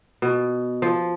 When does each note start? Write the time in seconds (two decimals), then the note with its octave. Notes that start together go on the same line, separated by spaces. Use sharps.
0.22 B2
0.82 F3